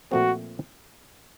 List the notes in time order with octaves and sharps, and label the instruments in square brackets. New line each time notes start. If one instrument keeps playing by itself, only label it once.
[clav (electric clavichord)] A#2 F3 A3 C4 [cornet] F#4